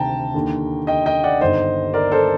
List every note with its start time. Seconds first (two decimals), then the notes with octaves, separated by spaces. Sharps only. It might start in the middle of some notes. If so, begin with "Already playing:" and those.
Already playing: D2 C3 D#3 G5 A5 A#5
0.34 D#2 D3
0.87 D#5 G5
1.06 D#5 G5
1.24 D5 F#5
1.41 G1 G2 D#3 C5 D#5
1.94 A#4 D5
2.12 A4 C5